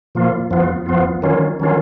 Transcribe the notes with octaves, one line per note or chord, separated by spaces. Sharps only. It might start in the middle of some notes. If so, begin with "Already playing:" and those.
A#2 F3 A#3 F4
F2 F3 B3 F4
F2 F3 B3 F4
D#3 F#3 C#4 F4
D#3 F#3 C#4 F4